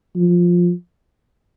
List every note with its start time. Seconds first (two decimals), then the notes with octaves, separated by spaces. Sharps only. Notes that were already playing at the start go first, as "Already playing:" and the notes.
0.16 F3